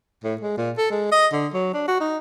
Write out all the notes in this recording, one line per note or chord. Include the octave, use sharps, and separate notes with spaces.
A2
G#3
A#2
A4
G#3
D#5
D3
F#3
D4
F#4
D#4